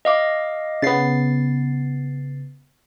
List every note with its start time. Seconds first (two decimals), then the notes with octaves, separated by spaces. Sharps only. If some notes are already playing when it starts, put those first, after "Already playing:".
0.05 D#5 F5 D6
0.82 C#3 B3 A6 C7